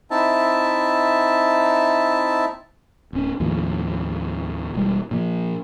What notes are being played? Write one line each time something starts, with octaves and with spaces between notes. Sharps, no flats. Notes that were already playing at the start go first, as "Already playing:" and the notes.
C4 D#4 E4 E5 A5
D1 C#4
D#2 A2 D#3 F3
E1 G3
A#2 F3